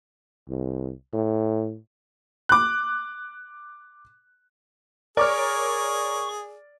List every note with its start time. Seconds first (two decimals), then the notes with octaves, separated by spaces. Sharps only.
0.49 C2
1.13 A2
2.49 D6 F#6
5.17 G#4 A#4 C#5 D5 C#6 D6 F6